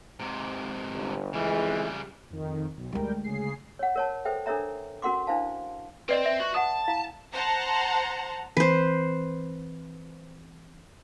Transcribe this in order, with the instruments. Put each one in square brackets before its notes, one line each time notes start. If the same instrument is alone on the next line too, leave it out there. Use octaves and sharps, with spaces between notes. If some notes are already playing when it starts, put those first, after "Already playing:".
[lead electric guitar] G#2 C3
[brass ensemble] G1
[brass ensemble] F2 E3 G#3 [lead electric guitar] C#3 G3
[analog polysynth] F2 D#3
B1
[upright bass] D2 G#3 [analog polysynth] G3 A#4 G5
[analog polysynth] C#3 G#4 C7
[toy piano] C#5 F#5
A#4 C#5 A5
A4 B4 C5 E5 G5
D4 A4 A#4 C#5 E5 A#5
C#4 F#4 A#4 F#5 C6 D6
D4 E4 C5 F5 A5
[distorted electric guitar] C4 C5 [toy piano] B4 D5 D#5
[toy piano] E5
[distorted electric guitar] F#4
[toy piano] F#5 D#6 [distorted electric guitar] A5
[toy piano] E4 F5
[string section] C5 F#5 A5 A#5
[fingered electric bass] E3 C4 [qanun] B4 C5